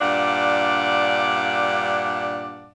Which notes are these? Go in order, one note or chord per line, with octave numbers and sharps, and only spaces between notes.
G2 A#2 D4 D5 F5 F#5